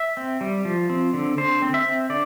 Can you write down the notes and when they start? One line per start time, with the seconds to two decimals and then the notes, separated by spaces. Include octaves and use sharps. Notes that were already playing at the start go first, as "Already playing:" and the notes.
Already playing: E5
0.17 C4
0.41 G3
0.65 F3
0.89 C4
1.13 D3
1.38 D3 C5
1.62 C4
1.74 E5
1.86 C4
2.10 D3 D5